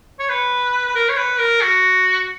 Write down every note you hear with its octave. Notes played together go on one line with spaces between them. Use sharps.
C#5
B4
B4
A#4
C#5
B4
A#4
F#4